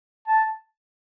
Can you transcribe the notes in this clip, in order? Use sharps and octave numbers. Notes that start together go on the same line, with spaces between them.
A5